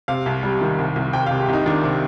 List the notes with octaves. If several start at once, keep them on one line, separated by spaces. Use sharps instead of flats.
C3 F5
C2
G3
D#3
C2
C2
C2 G5
C3 F5
G4
C2 D#4
D#3 D4
C3